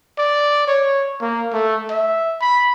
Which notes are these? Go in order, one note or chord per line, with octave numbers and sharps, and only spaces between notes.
D5
C#5
A#3
A3
E5
B5